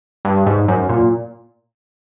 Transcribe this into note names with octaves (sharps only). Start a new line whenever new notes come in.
G2
G#2
F#2
A#2